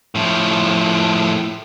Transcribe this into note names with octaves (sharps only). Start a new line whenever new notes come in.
A2 F3